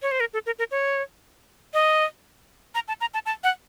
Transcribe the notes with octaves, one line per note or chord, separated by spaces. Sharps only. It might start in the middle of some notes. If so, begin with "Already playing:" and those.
C#5
C5
A#4
A4
A#4
A#4
C#5
D#5
A#5
A5
A#5
A5
A5
F#5